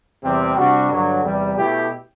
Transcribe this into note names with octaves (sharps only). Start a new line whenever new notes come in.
E2 C3 G3 C4 G4
C3 G3 D4 F#4
G2 D3 F#3
E2 C3 G3
B2 A3 E4 G4